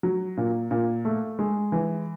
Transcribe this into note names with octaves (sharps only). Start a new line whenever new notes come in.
F#3
A#2
A#2
A3
G#3
E3